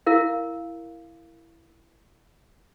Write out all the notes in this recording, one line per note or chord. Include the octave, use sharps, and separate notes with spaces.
E4 A#4 F5